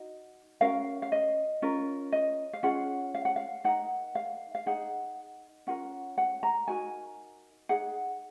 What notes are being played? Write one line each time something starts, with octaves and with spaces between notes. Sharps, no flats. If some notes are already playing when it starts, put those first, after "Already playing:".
Already playing: D#4 F#4 D#5
C#4 F#4 A#4 F5
F5
D#5
C#4 F4 A#4
D#5
F5
C#4 F4 G#4 F#5
F5
F#5
F5
D#4 A#4 F#5
F5
F5
D#4 G#4 F#5
C#4 F4 A#4 F#5
F#5
A#5
D#4 F#4 A#4 G#5
D#4 G#4 F#5